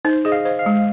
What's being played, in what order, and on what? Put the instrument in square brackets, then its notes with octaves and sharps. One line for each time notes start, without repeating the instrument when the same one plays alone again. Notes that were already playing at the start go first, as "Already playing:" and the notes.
[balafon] D#4 [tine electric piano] C5
[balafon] G#4 [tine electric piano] D#5
[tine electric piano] F5
[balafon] C5
[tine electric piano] F5
[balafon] G#3